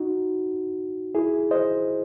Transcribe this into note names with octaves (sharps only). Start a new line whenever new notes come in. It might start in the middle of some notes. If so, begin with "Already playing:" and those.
Already playing: D#4 F#4
E4 G#4
C5 D#5